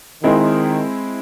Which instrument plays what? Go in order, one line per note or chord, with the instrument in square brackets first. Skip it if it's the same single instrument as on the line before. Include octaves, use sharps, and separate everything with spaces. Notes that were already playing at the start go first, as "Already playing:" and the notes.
[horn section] D#3 [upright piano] G#3 C4 E4